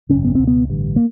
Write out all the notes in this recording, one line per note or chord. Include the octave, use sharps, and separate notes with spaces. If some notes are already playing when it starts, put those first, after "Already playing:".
G#1 F#2 C#3 C#4
B3
C#2 B2 C4
B3
A1 G2 D3
A#3